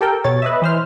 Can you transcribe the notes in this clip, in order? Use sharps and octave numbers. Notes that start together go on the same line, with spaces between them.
G4 A4 A#4 G5
B2 C#5 A6
B4 D#5 E5
E3 C5 F6